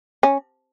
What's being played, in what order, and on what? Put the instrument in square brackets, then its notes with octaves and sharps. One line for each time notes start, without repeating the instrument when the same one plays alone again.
[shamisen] C#4